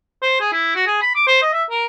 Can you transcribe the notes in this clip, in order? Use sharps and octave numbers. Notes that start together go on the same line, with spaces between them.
C5
G#4
E4
F#4
G#4
B5
D6
C5
D#5
E5
A#4